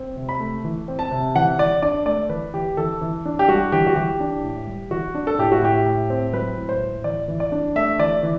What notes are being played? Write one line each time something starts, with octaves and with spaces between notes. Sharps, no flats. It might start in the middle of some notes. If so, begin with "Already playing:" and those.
Already playing: C4
C3
B5
A3
E3
C4
A5
C3
E3 F#5
E3 D5
D4 D5
A3 D5
E3 B4
E3 G4
E3 A4
E3
D4
G4
G3 F#4
E3 G4
F#4
E3 G4
D4
A2
G3
E3 F#4
D4
A4
A2 G4
F#4
A2 G4
A2
C4
F#3 B4
A2
C5
A2
E3 D5
E3
D5
D4
A3 E5
E3 D5
E3